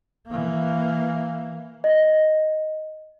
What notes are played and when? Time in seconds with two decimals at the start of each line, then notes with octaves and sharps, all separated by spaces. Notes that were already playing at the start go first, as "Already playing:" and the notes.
0.27 E3 A#3
1.84 D#5